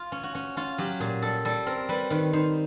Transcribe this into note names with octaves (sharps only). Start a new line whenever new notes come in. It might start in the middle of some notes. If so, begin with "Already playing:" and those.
Already playing: F4
C#4
F#4
C#4
C#4 F4
F#3 G4
A#2 G#4
G3 A4
G3 A4
C4 A#4
G3 B4
D#3 B4
D#4 C5